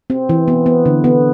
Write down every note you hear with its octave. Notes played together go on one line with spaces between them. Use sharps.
C4
E3
B3
B3
D3
B3